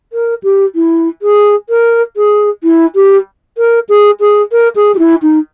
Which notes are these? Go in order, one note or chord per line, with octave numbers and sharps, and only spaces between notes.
A#4
G4
E4
G#4
A#4
G#4
E4
G4
A#4
G#4
G#4
A#4
G#4
G4
E4
D#4